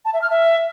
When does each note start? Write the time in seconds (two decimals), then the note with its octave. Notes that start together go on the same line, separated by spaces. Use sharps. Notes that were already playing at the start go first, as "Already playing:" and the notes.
0.05 A5
0.13 E5
0.22 F6
0.30 E5